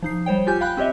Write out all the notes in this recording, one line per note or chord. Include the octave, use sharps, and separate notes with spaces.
F3 D#4 C7
G3 C5 C#5 G5
F4 G4 G#5 G6
F5 G5 B5 F#6
C4 G4 C#5 D#5 E5